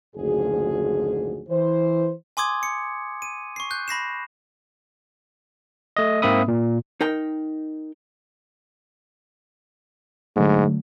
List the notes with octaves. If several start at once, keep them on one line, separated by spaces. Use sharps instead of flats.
F#1 D2 G#2 F3 F#4 G#4
E3 C5
G#5 C6 D6 D#6 G#6
C#7
D#7
C#6 C7
F#6 G6
B5 A#6 C7 E7
A3 D#5
G#2 A#3 C4 E5 B5 D#6
A#2
D#4 A#4 G5
G#2 D3 F#3 A3